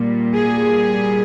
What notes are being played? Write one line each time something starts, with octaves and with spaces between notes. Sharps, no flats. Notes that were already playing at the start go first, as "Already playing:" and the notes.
Already playing: A#2 G3
G#4